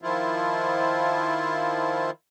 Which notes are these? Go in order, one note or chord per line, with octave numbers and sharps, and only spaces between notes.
D#3 F3 E4 F4